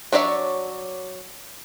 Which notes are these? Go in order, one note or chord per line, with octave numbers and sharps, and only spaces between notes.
F#3 D4 C#5 D5 E5